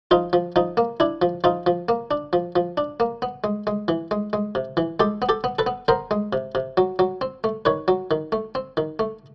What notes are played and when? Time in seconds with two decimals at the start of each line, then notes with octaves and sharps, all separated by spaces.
0.11 F3 D#4 F4
0.33 F3
0.56 F3 D#4
0.77 A#3
1.00 D4 E4
1.22 F3
1.44 F3 D#4 F4
1.66 F3
1.89 A#3
2.11 D4
2.33 F3
2.56 F3
2.77 D4
3.00 A#3
3.22 B3
3.44 G#3
3.67 G#3
3.88 E3
4.11 G#3
4.33 G#3
4.55 C3
4.77 E3
5.00 G#3 G4 A4
5.22 B3
5.29 G4 A4
5.44 B3
5.59 A4 B4
5.66 B3
5.88 B3 A#4 C5
6.11 G#3
6.33 C3
6.55 C3
6.77 F#3
6.99 F#3
7.21 C4
7.44 A3
7.65 D#3 B4 C#5
7.88 F#3
8.11 D#3
8.32 A3
8.55 C4
8.77 D#3
8.99 A3